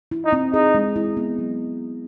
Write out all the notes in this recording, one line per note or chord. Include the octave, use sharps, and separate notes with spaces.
E4
D#4
C4
D#4 G#4
G#3
E4
B3
F#3